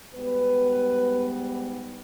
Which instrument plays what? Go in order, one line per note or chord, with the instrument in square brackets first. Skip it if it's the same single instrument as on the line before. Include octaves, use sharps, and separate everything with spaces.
[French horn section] G#2 G3 B3 B4